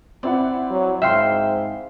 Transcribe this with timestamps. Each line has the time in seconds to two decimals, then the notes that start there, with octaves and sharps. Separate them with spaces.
0.23 C4 E4 D5 F#5
0.70 F#3
1.02 G#2 E5 F5 G5 C6